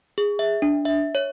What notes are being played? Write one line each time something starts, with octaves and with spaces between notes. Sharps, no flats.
G#4
E5
D4
E5
C#5